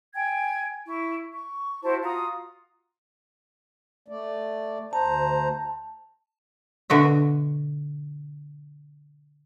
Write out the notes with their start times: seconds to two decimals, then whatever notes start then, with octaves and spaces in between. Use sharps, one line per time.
0.15 G5 G#5 G#6
0.87 E4 C#6
1.30 C#6
1.83 E4 F#4 C5 A5
2.02 F4 F#4 A#5 D#6
4.08 A3 D5
4.93 D2 C5 A5 A#5
6.90 B2 D3 F#4 E5